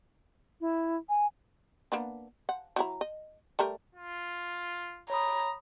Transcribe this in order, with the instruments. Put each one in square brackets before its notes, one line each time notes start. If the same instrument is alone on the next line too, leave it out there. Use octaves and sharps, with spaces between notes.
[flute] E4
G#5
[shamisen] A#3 B3 D4
F#5
F#3 E4 A#5
D#5
G3 A3 A#4
[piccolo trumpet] F4
[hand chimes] C#5 B5 D#6 [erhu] A#5